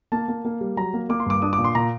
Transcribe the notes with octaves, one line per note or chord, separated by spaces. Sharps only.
A#3 A5
A#3
A#3
G3
F#3 A#5
A#3
A#3 D6
C6
G2 D6
D4 D#6
D6
A#2
C6
A#2 A#5